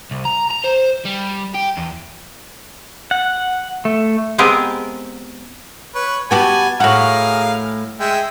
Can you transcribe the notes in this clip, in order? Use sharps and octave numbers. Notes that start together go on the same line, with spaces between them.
C2
A#5
A#5
C5
G3
G4
E2
F#5
A3
G#3 B3 C4 G4 G#4 A#4
B4 C#5
B3 F#4 G4 G#5 A5
A2 F#4 G#4 A#4 F5
G#3 E5 G5